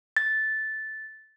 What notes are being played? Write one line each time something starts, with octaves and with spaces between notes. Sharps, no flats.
A6